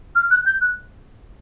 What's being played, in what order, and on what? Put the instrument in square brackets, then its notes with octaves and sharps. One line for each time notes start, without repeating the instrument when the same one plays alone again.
[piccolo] F6
F#6
G6
F#6